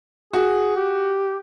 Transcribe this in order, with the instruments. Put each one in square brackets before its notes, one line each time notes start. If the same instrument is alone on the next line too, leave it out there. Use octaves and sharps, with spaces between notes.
[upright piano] F#4 [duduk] G#4
[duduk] G4